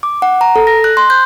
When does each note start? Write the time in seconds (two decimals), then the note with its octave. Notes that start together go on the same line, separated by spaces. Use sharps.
0.03 D6
0.22 F#5
0.41 A#5
0.56 A4
0.67 A#6
0.84 F#6
0.97 C6
1.10 G6